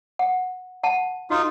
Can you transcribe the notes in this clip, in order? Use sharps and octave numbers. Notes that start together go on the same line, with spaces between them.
F#5
F#5 A5
D#4 F4 F#4 A4